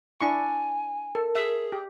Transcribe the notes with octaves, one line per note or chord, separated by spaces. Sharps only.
D4 E4 G#5 C#6
A4 A#4
G#4 E5
G4